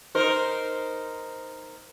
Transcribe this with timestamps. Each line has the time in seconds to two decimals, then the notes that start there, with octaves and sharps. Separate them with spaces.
0.15 D#4 A#4 C5